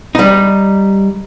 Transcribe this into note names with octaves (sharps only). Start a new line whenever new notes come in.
G3 D#4